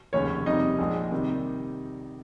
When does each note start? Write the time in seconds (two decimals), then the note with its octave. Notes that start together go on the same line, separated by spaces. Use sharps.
0.13 F1 D#2 C#3 C#4 C#5
0.46 F2 C3 G3 D#4 D#5
0.79 A#1 A#2 G#3
1.11 C3 D#3 G3